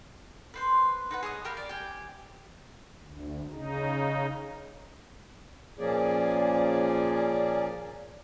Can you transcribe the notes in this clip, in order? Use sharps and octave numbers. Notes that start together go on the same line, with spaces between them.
B4 C5 C6
D#4 B4 F#5
G#4 C#5 D#5 D#6
G4 A#4 F5 B5
D5
G4 G5 G#5
D2
C#3 D#4
A#2 F3 A#3 C#4 G#4 D5